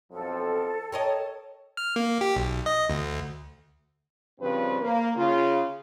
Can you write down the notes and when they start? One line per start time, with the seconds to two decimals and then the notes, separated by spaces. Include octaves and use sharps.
0.12 B1 F2 F3 A4
0.92 A#4 C#5 D#5 G5 A5
1.77 F6
1.96 A#3
2.21 G4
2.36 B1
2.66 D#5
2.90 D2
4.40 G2 C#3 F3 G3 C4 B4
4.81 A#3
5.16 C#3 F4